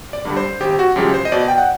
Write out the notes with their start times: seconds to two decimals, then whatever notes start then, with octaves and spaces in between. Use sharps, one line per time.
0.13 D5
0.25 G2 D3 G3
0.37 C5
0.60 G#1 G4
0.79 F#4
0.96 F#2 C#3 F3 G#3 G4
1.14 C5
1.25 D#5
1.32 B2 D5
1.48 G5
1.58 F#5